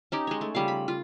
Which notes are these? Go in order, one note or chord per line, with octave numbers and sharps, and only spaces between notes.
C#4 D#4 G4
G#3 C#5
A3
C#3 G3 F4 F5
B5
F4